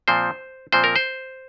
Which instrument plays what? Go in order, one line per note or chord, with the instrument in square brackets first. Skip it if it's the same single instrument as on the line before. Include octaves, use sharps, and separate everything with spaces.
[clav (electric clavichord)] A#2 F3 C4 C5
A#2 F3 C4 C5
A#4
C5